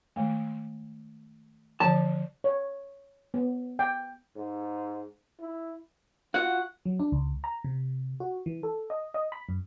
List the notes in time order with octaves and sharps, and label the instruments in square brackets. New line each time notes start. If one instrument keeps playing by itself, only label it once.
[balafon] D#3 G#3 A3
[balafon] D3 E3 F3 [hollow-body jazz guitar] A5
[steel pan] C#5
B3
G5
[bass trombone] G#2
E4
[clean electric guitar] F4 F#4 [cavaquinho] F#5
[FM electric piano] F#3
D4
C#2
A#5
C3
F#4
E3
A4
D#5
D#5
B5
F#2